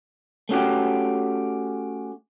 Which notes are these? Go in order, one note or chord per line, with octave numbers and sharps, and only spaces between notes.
A3 C#4 F#4 G4